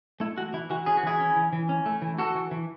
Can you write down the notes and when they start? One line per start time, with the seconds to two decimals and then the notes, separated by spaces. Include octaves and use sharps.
0.20 A3 E4
0.37 E3 F#4
0.53 E3 E4
0.70 E3 F#4
0.86 C#4 G#4
0.97 F#4
1.03 E3 E4 G#4
1.20 C#4
1.36 E3
1.53 E3
1.69 C#4
1.86 A3
2.02 E3
2.18 E3 F#4 A4
2.35 E3
2.51 E3